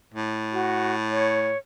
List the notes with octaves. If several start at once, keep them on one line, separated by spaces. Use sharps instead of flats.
A2
F#4
C#5